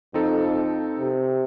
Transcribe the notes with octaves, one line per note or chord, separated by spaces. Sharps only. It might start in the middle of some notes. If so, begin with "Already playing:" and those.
F2 C4 D#4 A4
C3